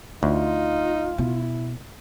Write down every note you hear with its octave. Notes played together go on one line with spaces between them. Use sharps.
D2 D#4 F4
B2 E4